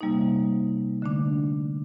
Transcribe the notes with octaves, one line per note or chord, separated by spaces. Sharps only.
C3 G3 A#3 D#4
D3 A3 D4